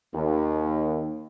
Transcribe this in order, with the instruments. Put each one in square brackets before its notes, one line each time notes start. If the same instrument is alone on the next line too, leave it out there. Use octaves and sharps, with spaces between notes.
[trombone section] D#2